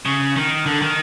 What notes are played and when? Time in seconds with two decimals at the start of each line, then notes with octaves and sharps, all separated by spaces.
0.05 C#3
0.36 D#3
0.66 D3
0.82 D#3